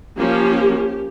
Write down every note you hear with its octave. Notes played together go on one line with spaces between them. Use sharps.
F3 A#3 C#4 G4